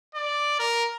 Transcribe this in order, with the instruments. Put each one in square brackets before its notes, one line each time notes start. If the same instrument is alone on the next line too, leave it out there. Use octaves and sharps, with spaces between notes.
[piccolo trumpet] D5
A#4